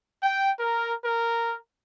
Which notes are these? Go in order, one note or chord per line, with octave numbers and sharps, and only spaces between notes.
G5
A#4
A#4